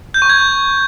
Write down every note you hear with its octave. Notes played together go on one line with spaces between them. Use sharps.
G6
C#6
G#6